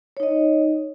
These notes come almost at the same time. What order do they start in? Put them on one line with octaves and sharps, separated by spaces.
C#5 D#4 D#5